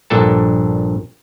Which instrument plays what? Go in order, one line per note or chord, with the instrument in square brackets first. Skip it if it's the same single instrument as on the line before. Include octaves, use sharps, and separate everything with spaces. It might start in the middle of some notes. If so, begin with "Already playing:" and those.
[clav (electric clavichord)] A#1 G2 A#2 D4 A4 A5